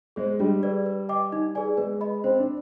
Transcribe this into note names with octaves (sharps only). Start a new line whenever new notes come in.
G#3 G#4 C5
G3 D4
G#4 B4 D5
B4
D#5 G5 D6
D#4
G#4 B4 D5 G#5
G#3 B4
D#5 B5
C4 C5
D4